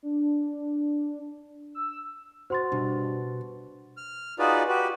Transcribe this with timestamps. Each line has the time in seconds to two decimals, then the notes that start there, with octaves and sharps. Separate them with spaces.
0.03 D4
1.75 E6
2.50 F#4 C5 C6 A6
2.72 G2 B2
3.97 F6
4.39 D#4 F4 F#4 G#4 B4 D5
4.69 F#4 G4 B4